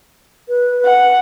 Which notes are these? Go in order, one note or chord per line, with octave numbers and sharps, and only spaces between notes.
B4
F#5